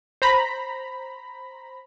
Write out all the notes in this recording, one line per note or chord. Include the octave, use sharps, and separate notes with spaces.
C5 A#5 B5